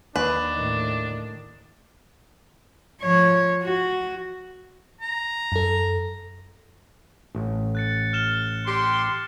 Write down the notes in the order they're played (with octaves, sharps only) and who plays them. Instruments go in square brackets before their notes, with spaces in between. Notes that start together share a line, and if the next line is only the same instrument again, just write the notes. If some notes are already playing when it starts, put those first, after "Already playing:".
[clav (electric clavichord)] D#2 [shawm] D4 [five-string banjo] B4
[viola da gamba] A2 D#3
[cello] F3 C#5
F#4
[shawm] A#5
[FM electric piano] F#2 A4
[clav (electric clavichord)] A1
[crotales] F#6 A6 C#7
F6 E7 G7
[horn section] G4 C6